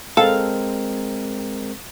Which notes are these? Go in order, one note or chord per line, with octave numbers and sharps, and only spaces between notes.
G#3 C4 A4 A#4 F5